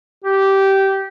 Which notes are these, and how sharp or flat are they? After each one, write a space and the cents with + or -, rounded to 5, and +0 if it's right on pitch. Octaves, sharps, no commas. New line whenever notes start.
G4 -15